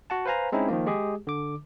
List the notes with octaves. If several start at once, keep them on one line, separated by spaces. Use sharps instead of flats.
F#4 F#5 A5
B4 C5 F5 G#5 A#5
G#3 C4 C#4 D#4 E4
D#3 F3 A#3
G#3 G4 G#4
D3 D6